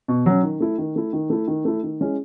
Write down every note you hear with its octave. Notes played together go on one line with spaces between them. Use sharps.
B2
F#3 C#4
D#3
A3 E4
D#3
A3 E4
D#3
A3 E4
D#3
A3 E4
D#3
G#3 C#4 E4